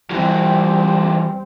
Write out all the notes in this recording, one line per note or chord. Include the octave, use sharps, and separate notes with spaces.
E3 F#3 G3 C4